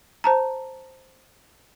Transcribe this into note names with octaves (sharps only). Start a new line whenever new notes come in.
C5 A5 A#5